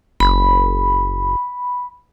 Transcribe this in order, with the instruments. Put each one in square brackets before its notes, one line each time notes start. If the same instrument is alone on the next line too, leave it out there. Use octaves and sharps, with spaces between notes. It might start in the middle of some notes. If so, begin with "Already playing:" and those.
[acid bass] F#1 [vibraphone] B5